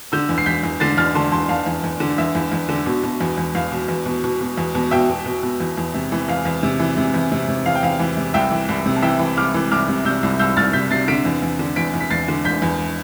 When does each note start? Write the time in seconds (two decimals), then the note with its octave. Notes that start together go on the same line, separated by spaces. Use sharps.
0.12 D3 E6 G6
0.29 E2
0.38 C7
0.46 E2 G6 B6
0.63 E2
0.80 D3 A6 C7
0.97 E2 F6 A6
1.15 D3 A5 C6
1.31 E2 A5 C6
1.49 E2 F5 A5
1.66 E2
1.84 E2
2.00 D3
2.18 E2 E5
2.35 E2
2.52 E2
2.69 D3
2.86 B2
3.03 B2
3.20 E2
3.37 E2
3.55 E2 F5
3.72 B2
3.88 E2
4.06 B2
4.24 B2
4.41 B2
4.57 E2
4.75 B2
4.91 B2 E5 G5
5.09 B2
5.26 B2
5.43 B2
5.60 E2
5.77 E2
5.94 C3
6.12 E3
6.28 E2 F5
6.45 E2
6.63 C3
6.79 E3
6.97 C3
7.14 E2
7.32 C3
7.48 C3
7.66 E2 F5
7.75 G5
7.83 E2 F5
7.99 E3
8.17 C3
8.34 C2 E5 G5
8.51 E3
8.69 C2
8.86 C3
8.96 A5
9.02 E3 E5 G5
9.19 E3
9.37 C2 D6 F6
9.54 E3
9.71 C2 D6 F6
9.88 C3
10.05 C3 E6 G6
10.23 C2
10.39 C2 E6 G6
10.57 C2 F6 A6
10.73 C3 G6 B6
10.91 C3 A6 C7
11.08 D3 B6 D7
11.25 E2
11.42 E2
11.59 D3
11.76 E2 B6 D7
11.94 E2
12.00 B6
12.10 E2 A6 C7
12.28 D3
12.45 E2 G6 B6
12.62 E2